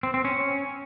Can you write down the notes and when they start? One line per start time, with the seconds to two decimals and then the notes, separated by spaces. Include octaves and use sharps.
0.03 C4
0.14 C4
0.25 C#4